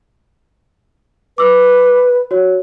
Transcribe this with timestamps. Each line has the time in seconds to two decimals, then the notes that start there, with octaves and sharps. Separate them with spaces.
1.38 B4 D6 E6
2.31 F#4 C#5